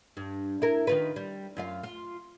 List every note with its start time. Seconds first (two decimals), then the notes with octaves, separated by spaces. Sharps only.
0.17 G2
0.62 E4 A#4
0.87 D#3 F4 B4
1.16 G3
1.57 F#2 F4 F5
1.83 F4